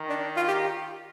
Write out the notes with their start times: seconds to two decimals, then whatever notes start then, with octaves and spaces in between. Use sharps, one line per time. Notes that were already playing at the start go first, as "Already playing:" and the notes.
Already playing: D#3
0.09 D4
0.37 F4
0.48 G4